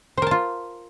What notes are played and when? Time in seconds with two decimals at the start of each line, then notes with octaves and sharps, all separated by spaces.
0.17 C5
0.22 A#4
0.27 A5
0.31 F4